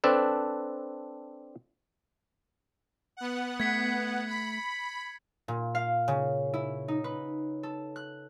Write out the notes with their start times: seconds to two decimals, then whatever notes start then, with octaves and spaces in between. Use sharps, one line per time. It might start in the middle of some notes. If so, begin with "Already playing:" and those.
0.04 C4 D4 A4 B4
3.17 B3 F#5
3.60 A3 G#6 B6 C#7
4.27 B5
5.48 A#2
5.75 F5
6.08 C#3
6.54 E4
6.88 D#4
7.04 B4
7.63 A4
7.96 F#6